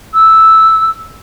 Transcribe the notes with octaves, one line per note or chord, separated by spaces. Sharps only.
E6